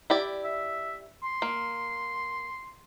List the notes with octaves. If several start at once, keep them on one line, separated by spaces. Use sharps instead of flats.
E4 G4 D5
E5
C6
A#3